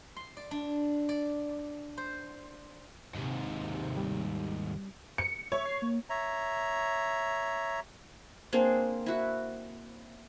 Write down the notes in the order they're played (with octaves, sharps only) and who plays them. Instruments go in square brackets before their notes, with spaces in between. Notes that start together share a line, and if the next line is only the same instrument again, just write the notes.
[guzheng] C6
D5
D4
D5
C5
[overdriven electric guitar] D#2 G#2 [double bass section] C3
[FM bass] G3
[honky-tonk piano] C#7
[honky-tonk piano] C#5 [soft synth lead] E5
[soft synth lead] C7
A#3
[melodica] C#5 E5 A#5
[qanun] A#3 C4 D4 G#4
E4 F#4